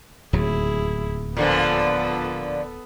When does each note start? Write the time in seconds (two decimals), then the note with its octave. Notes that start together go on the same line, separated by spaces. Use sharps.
0.33 D1 D#2 F#3 E4 G#4
1.37 A#2 D3 F3 B3 A4